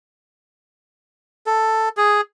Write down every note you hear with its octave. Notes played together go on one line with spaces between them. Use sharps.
A4
G#4